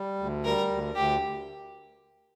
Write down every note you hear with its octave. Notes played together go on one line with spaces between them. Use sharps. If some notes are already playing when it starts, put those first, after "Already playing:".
Already playing: G3
D2
G3 A#4
D2
D2 G4